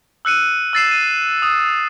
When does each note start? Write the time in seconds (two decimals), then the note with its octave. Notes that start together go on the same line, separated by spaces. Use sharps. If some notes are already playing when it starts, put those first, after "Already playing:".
0.25 E6 F#6 C#7 D#7
0.73 E6 A6 C7 E7
0.91 D#7
1.42 D#6